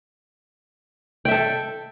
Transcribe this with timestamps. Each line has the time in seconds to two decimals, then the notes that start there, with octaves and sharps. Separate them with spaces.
1.25 G5
1.28 E5
1.31 A4